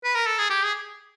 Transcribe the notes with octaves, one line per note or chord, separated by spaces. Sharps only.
B4
A#4
A4
G#4
G4
G#4